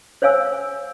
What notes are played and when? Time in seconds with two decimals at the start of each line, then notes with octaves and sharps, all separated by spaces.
0.22 C5 C#5 F5 G#5 E6